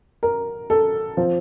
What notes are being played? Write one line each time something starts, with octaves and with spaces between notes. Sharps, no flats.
A#4
A4
F3 C4